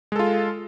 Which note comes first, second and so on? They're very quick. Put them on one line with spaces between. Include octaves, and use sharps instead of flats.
G#3 A4 F4